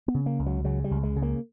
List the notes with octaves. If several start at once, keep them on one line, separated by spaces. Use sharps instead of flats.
B3
C#3
A#3
C#2
F#3
C#3 F#3
G3
C#2
G#3
C#3
A#3